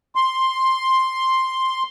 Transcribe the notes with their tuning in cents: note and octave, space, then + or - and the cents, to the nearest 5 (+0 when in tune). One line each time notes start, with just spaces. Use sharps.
C6 +5